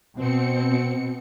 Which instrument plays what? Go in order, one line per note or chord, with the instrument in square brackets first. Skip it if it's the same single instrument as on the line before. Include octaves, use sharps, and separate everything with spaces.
[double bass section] B2 [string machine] C4 C#7